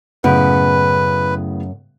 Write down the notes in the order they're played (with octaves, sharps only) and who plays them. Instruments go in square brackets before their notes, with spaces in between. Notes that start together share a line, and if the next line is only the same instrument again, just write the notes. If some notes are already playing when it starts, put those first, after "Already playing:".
[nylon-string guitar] F#2 [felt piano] A2 C#3 B3 [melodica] B4